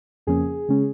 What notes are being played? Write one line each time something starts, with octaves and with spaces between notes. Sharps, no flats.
F2 C#3 F3 A#3 C#4 G#4
C#3 G#3 C#4